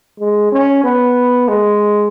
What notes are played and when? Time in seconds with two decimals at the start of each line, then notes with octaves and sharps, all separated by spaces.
0.20 G#3
0.52 C#4
0.84 B3
1.48 G#3